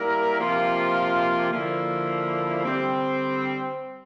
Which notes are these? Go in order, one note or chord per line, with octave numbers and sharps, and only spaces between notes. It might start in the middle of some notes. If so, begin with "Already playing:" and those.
Already playing: G3 A#3 E4 A#4
C3 F3 A#3 F4
D3 F3 A#3 E4
D3 G3 C4